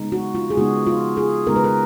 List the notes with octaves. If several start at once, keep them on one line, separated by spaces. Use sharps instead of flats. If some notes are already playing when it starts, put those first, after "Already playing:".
Already playing: C#3 G#3 B3 D#4
F#4
F4
G#4
C#3 G#3 B3 D#4 F#4
F4
G#4
C#3 G#3 B3 D#4 A#4
B4
A#4